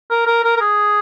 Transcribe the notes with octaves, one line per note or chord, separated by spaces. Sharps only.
A#4
A#4
A#4
A#4
G#4